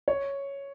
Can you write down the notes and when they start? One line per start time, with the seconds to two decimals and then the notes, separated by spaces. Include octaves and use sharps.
0.08 C#5